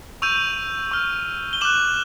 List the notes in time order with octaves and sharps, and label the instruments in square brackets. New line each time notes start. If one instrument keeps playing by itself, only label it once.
[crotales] C#6 E6 G6 D#7 F7
C#6 F6
G7
D6 F#6 E7 F#7